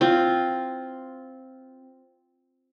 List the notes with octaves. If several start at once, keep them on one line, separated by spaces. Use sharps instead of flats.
C4 F4